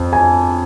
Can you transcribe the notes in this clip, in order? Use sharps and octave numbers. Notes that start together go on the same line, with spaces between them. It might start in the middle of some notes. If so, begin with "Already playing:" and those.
Already playing: F2
G#5